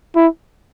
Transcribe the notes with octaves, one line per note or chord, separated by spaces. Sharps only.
E4